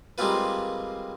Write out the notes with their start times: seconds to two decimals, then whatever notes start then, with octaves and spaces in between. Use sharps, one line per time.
0.18 G3 G#3 A#3 C4 F4 B4